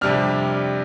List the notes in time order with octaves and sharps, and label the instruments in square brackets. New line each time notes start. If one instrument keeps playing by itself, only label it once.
[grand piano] F2 C3 G3 D4 F6